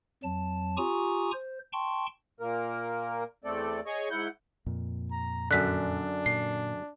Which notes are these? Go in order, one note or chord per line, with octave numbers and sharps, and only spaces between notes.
F2 F#3 A5
F4 G4 G#5 A#5 C#6 D#6
C5
G5 A5 C6 C#6
A#2 A#3 A#4
E2 A3 C4 A4 D5
G#4 C#5 D#5 C#6
G#2 E4 F#5 G6
F2 A#2
A#5
F#2 D3 D4 F#6 B6
A#2 C7